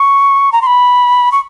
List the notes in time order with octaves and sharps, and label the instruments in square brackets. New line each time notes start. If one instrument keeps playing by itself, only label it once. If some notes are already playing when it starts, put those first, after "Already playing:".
Already playing: [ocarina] C#6
A#5
C6
B5
C#6